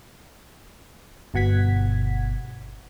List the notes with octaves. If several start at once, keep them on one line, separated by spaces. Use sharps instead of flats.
G1 B2 F#5 G#6 B6